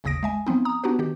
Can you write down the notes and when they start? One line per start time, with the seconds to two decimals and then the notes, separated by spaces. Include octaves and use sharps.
0.04 G#1 D#2 C#3 D#6 A#6 D7
0.23 G#3 E5 G#5
0.47 F3 B3 C4 D#4
0.65 A#5 D#6
0.84 B3 D4 D#4 F#4 G4 B4
0.99 D#3 G4